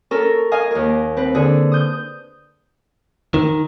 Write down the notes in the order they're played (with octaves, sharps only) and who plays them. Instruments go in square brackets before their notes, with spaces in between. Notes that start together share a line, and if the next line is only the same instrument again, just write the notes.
[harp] C#4 A4 A#4
D#5 F5 G#5
D#2 A#4
C4 B4
D3 G#4
D#6 G6
[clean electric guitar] D#3